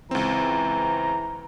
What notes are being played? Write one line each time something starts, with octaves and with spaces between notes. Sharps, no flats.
C#2 E3 C4 A#5